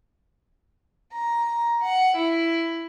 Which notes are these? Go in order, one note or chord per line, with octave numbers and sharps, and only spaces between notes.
A#5
F#5
E4